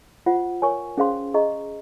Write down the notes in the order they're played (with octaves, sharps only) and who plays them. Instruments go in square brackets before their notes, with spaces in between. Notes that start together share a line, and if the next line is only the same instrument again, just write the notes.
[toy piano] F4 C5 F#5
A#4 C#5 G#5 C#6
C#4 G#4 C5 F5 C6
G#4 D#5 A#5 C#6